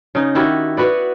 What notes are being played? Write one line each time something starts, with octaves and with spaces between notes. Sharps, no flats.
C#3 D#4
D#3 E4 F#4 G4
B3 F#4 B4 D5